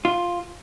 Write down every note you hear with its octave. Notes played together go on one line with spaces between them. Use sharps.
F4